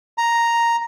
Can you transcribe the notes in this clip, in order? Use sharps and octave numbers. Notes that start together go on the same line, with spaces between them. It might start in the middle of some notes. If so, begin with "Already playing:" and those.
A#5